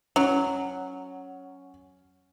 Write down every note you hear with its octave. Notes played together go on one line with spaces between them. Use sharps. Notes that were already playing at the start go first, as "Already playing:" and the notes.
F#3 C#4